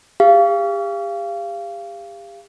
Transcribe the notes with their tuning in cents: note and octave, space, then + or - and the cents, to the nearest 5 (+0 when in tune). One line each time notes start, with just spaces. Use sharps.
G4 +40 F5 -25